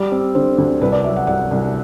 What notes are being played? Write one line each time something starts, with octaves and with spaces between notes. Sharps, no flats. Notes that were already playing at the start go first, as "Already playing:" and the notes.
Already playing: G3 D5
C4
D3 C5
D2
C2 B4
D5
F#3 E5
F#5
C2 F#5
C2